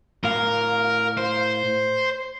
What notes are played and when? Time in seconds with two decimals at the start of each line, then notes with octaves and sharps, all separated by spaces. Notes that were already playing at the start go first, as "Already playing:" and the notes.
0.24 A2 A#4 F5
1.18 C5